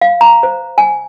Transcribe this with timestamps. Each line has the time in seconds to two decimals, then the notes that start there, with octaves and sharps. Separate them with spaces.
0.01 F5
0.21 A#5
0.43 C5
0.78 G#5